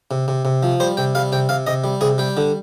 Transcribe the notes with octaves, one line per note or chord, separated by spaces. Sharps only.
C3
C3
C3
F3
G3 C5
C3 G5
G3 F5
C3 G5
C3 F5
C3 D#5
G3
C3 G#4
G3 G5
D3